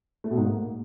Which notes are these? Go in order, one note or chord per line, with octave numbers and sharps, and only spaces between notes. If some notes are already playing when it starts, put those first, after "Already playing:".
A3
B2
G#2
A#3